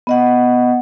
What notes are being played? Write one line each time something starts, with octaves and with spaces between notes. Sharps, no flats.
B3 D#5 F#5